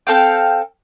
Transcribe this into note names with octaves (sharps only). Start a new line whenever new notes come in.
C4 A4 F5 G5